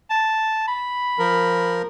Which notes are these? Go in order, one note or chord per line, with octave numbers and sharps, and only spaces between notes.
A5
B5
F3 A#4